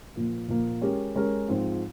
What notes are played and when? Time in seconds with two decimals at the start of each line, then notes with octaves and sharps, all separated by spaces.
0.16 A#2 F3 A#3
0.48 A#2 F3 A#3
0.82 G#3 C#4 G4 A#4
1.16 G#3 C#4 G4 A#4
1.48 G#2 F3 C4 F4